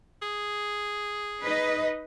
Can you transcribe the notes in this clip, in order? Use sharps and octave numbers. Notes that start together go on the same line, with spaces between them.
G#4
D#4 B4 D#5